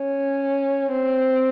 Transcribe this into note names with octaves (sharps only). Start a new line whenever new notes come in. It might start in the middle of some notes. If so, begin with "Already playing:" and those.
Already playing: C#4
C4